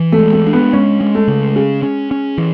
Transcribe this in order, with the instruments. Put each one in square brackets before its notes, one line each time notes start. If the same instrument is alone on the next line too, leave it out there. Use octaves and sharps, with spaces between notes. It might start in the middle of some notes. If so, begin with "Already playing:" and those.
Already playing: [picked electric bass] E3
[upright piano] A3
[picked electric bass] G#3
[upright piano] A3
[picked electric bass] D4
[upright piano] B3
[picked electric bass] G#3 [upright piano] C#4
[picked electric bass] G#3
[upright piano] A3
[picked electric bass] C#3
[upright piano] G#3 [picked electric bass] C#4
[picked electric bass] C#4
C#4
E3